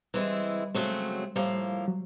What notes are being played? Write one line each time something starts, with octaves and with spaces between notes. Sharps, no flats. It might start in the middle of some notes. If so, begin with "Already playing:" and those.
E3 G3 G#3 C4 E4
C#3 F#3 G#3 A3 C4
A2 F3 G3 A#3
F#3